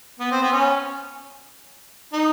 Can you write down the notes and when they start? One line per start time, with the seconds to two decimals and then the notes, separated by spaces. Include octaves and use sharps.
0.20 B3
0.31 C4
0.42 B3
0.52 C#4
2.13 D#4